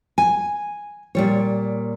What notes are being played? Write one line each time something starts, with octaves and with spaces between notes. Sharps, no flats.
G#5
A#2 G3 C#5